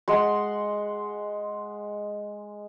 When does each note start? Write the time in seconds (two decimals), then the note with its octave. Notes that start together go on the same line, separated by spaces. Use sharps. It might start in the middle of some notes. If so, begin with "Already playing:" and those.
0.08 G#3 F#5 C6